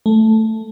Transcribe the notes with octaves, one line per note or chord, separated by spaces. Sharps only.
A3